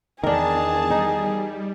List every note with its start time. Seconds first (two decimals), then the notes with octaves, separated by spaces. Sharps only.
0.24 E2 D#3 D4 G#4 A#4 A5
0.90 G3 D#4